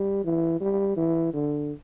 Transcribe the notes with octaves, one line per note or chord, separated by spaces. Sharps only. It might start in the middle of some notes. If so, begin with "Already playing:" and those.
Already playing: G3
E3
G3
E3
D3